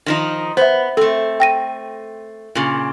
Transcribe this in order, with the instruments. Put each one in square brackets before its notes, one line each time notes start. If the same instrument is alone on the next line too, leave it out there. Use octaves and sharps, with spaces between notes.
[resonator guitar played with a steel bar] D#3 F3 D#4
[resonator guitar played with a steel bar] B3 [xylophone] C5 E5
[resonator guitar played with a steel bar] A3 C4 [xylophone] A4
[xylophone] G5 A#6 D#7
[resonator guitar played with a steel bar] A#2 C#3